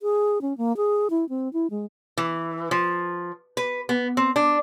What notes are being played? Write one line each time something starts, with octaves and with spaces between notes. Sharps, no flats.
G#4
C#4
A#3
G#4
E4
C4
E4
G#3
E3
F3
B4
B3
C4
D4